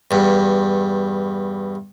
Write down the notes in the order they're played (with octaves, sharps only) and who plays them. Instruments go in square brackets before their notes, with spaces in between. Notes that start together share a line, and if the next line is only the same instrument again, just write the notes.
[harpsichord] E2 G2